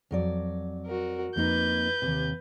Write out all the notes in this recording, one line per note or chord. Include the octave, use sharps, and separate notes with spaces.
F2 F#3 D5
F#4 A#4
F2 A#3 D#4 B4 G6
D#2 C3